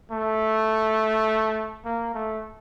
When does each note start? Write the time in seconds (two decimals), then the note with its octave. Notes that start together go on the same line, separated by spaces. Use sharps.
0.12 A3
1.85 A#3
2.14 A3